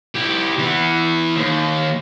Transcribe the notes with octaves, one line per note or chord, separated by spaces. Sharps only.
E4 G4
E3 B3
D#2